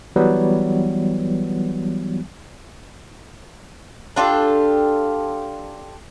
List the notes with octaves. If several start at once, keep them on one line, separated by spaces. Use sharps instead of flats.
E3 F#3 G3 B3
D4 F4 G4 A4